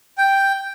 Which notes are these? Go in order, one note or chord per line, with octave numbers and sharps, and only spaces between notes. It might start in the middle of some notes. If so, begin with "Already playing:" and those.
G5